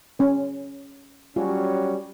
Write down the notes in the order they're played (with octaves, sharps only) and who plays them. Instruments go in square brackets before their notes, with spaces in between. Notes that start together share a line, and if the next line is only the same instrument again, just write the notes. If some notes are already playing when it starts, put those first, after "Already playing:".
[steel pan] C#4 C#5
[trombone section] F#3 G3 C#4 [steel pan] F4